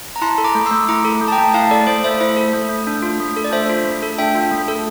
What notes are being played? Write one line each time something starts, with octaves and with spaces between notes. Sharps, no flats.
A#5
E4 A5 C6
A4
A#5 D6
A3
C6 E6
A3
E4 A#5 D6
A4
A3
A5
G5 A#5
A3
E4 F5 A5
A4 D5
A3 C5
A3 C5 E5
E4 C5 E5
A4
A3
A3
D4
F4
A3
A4
D5
D4 C5 E5
F4
A3
A4
D4 E5 G5
F4
A3
A4